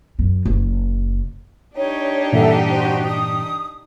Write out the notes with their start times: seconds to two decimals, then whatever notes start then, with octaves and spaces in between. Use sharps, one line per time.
0.19 F#2
0.45 F#1
1.76 D4 D#4 G4 C#5
2.33 G2 A#2 E3 A4 E5 F#5
2.70 F#4 C5
3.05 D#6